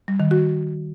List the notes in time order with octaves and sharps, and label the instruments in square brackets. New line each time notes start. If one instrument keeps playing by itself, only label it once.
[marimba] G3
D#3
F#4